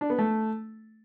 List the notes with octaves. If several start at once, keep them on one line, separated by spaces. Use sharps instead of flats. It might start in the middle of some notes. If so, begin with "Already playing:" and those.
D4
B3
A3